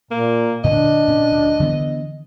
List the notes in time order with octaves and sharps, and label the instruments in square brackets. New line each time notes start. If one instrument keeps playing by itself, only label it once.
[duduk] A#2 [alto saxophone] A#3
[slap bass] A#2 D3 [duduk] D4 [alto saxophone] D#5
[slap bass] A#2 C#4
D2
D3 E3 B3